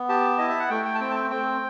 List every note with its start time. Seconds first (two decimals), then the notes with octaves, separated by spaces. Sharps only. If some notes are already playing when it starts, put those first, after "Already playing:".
Already playing: B3
0.09 G4 A5
0.38 E4 D#5
0.48 E5
0.60 F#5
0.70 A3 G5
0.85 G5
0.95 A5
1.00 C4 G5
1.11 A5
1.16 G5
1.30 C4 G5